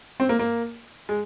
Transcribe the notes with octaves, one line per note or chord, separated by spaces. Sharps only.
C4
A#3
A#3
G#3